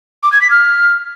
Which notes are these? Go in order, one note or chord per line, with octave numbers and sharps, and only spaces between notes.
D6
G#6
B6
F6